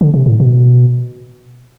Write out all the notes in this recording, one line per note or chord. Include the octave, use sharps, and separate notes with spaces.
D3
C3
A2
B2